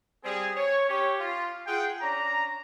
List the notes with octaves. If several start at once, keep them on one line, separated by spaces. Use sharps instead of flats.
G3 C4 G#4
C#5
C#4 G4 C#5
F4
F4 G#4 F#5 G5
C#4 D4 A#5